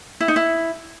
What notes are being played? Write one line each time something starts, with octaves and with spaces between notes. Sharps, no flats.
E4
D#4
E4